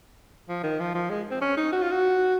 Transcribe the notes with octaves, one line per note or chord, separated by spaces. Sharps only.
F3
D#3
F3
F3
G#3
C4
C#4
D#4
F#4
F4
F#4